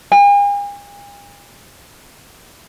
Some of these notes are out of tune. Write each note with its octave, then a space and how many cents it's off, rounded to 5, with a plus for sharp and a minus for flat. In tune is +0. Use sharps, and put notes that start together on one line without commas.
G#5 -45